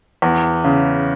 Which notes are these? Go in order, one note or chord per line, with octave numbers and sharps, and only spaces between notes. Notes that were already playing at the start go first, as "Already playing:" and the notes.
E2
C#3